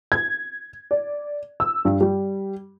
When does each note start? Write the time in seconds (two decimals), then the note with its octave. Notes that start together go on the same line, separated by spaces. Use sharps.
0.12 G#6
0.91 D5
1.60 E6
1.85 G2
2.01 G3